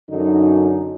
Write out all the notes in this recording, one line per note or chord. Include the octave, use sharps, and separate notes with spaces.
F#2 D3 D#4